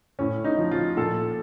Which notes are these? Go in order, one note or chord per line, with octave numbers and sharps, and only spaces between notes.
A2 C#4
D#4
F3
F4
A#2 A4